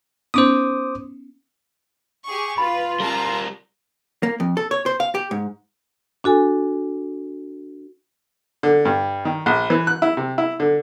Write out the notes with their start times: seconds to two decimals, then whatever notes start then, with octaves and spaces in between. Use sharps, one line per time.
0.34 B3 C#4 D#4 C5 D6 D#6
2.27 G4 G#4 C#6
2.58 F4 B4 B5
3.00 G3 A#4 A5 A#5
4.23 A#3
4.40 F2
4.57 A4
4.71 C#5
4.86 C5
5.00 F5
5.15 G4
5.31 G#2
6.24 D4 F#4 A4 G#5
8.63 D3
8.85 G2
9.25 D#3
9.46 A#1
9.70 E3
9.87 F#6
10.02 E4
10.17 C3
10.38 E4
10.60 D3